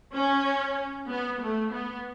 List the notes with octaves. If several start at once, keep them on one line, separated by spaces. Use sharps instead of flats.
C#4
B3
A3
B3